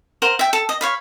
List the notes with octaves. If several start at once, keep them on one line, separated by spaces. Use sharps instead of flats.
A#4 C5 F#5
E5 G5
A4
D#5
C#5 F5 B5